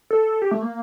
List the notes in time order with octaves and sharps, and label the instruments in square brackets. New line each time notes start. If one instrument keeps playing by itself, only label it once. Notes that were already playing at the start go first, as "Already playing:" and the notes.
[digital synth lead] A4
G4
A3
A#3